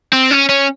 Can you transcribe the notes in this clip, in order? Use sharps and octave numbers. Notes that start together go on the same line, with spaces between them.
C4
C#4
C#4